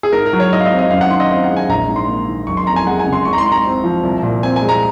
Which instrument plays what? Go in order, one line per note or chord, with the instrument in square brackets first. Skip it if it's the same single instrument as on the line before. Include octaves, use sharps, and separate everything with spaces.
[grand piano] G#4
G#2 A#4
A#4
F#3
C#5
G#2 D#5
F5
D#5
C4
D#5
F#2 F5
F#5
D#3 C6
D#5
C4 F5
F#5
G#3
G#5
A#1 A#5
G#2
C6
A#3
D#3
F#1 C#6
C6
F2 A#5
G#5
G#3 F#5
G#5
C#3
C6
G#1 C#6
A#5
C6
G#2
A#5
C4
F3
C2
A#2
C4 G#5
G#5
G#3
A#5